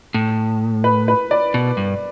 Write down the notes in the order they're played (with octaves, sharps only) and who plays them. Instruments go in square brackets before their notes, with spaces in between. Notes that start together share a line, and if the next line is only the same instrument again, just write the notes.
[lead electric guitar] A2
[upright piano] B4
B4
D5
[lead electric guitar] B2
G2